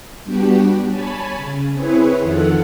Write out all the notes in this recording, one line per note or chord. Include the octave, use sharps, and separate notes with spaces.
G3 B3 D4 F#4 G4
C#5 G#5 A5 B5
C#3
C4 E4 G#4 B4 C#5
F2 D#3 F4 A4 F#5